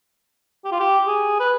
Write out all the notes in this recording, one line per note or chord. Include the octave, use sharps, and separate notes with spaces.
G4
F4
G4
G#4
B4